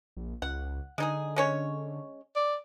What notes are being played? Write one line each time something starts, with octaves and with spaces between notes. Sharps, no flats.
A#1
C#2 F#5
D3 G#3 D#4 G#4
G#3 C#4 C#5
D5